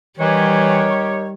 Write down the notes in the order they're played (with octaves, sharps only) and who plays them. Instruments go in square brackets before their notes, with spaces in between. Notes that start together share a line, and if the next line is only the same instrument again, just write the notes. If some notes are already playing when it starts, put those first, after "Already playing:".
[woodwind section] D#3 G4 C#5 [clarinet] E3 [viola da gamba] G3